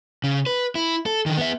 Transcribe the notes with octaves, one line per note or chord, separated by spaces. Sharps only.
C#3
B4
E4
A4
D3 D#3
B3 E5